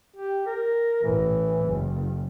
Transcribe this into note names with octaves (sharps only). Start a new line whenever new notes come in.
G4
A#4
A1 E3
F#1